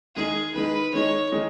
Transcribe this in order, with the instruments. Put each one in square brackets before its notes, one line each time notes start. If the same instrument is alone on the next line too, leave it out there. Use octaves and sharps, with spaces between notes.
[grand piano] D#3 G#3 D#4 [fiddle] G#4
[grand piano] D#3 G#3 D#4 [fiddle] B4
[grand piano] D#3 G#3 D#4 [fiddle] C#5
[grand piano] D#3 G#3 D#4